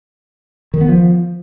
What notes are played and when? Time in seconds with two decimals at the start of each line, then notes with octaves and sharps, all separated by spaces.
0.74 D#3
0.81 B3
0.88 F3